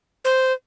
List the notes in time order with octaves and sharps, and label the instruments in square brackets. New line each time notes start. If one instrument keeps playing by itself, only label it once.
[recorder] C5